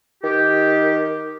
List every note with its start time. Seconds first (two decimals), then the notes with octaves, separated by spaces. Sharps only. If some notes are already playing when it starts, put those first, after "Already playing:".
0.24 D#3 G4